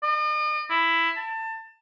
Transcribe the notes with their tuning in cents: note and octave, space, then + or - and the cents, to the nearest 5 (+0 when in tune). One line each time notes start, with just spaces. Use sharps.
D#5 -45
E4 +10
A5 +25